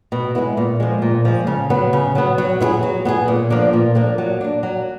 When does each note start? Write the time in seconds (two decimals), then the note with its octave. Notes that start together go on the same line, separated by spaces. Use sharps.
0.12 B2
0.35 G#3 B3 E4
0.57 A#2
0.80 F3 G#3
1.02 A#2
1.25 F3 G#3
1.47 C#3
1.70 F#3 B3
1.93 C#3
2.15 F#3 B3
2.38 F#3
2.60 B3 E4 G#4
2.83 F#3
3.05 B3 E4 G#4
3.28 A#2
3.50 F3 A#3 D4
3.73 A#2
3.95 F3 A#3 D4
4.18 F#3
4.41 A#3 D4
4.63 F#3